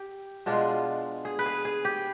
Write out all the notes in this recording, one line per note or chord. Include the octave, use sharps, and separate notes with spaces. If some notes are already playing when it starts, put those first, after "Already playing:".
Already playing: G4
B2 G#3 D4 F4
G#4
B4
G#4
G#4
G4